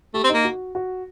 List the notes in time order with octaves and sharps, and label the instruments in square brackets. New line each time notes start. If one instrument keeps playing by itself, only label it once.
[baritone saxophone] A3 [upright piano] G4
[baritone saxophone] C4
[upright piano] D#4
[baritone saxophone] A#3
[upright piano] F#4
F#4